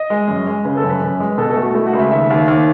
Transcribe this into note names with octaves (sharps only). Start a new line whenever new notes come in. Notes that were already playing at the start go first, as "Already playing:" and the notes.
Already playing: D#5
G#3
F#2
G#3
C#3 B4
A4
F#2
B4
F#2
G#3
B2 A4
A4
A3
F#4
A3 E4
F#4
C#2
E5
D#2 E5
D#2
D#2